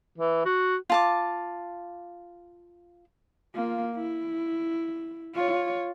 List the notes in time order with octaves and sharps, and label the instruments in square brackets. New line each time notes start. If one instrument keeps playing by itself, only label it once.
[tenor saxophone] E3
F#4
[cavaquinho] F4 A5 D6
[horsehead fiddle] A#3 F4
E4
F4 C#5